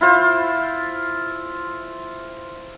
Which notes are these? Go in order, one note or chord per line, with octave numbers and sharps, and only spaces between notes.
E4 F4 C5